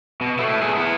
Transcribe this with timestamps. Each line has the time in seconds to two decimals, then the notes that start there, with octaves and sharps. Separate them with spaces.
0.21 B2
0.39 A3 E4
0.62 G#4 B4
0.76 B3 E4